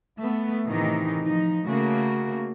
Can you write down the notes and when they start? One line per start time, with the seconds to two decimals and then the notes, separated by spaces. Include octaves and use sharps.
0.20 A3 B3
0.67 A2 C3 D#3 E3 D#4
1.26 F3 D#4
1.66 C#3 A3 A#3 F#4